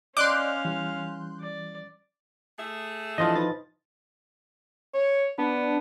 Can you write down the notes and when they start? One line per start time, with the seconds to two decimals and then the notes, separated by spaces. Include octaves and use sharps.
0.17 C#4 D5 D#5 F5 C6 D6 F#6 G6
0.65 E3 G3
1.40 D5
2.59 A3 G#4 E5
3.18 E3 F3 D4 A4 D#5
3.36 D#4 B4 A6
4.94 C#5
5.38 B3 D4